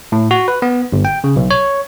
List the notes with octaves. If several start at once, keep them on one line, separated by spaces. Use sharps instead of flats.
A2
F#4
B4
B3
G1
G5
C#3
B1
C#5